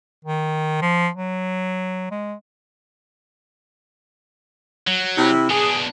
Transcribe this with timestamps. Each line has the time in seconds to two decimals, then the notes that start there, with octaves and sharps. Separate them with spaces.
0.25 D#3
0.81 F3
1.16 F#3
2.11 G#3
4.87 F#3
5.17 C3 E4
5.50 B2 D4 G#4